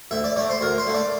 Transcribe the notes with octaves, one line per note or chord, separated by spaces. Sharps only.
D2 E5
D5
D3 A3 D5
C5
D2 A#4
C5
D3 A3
D5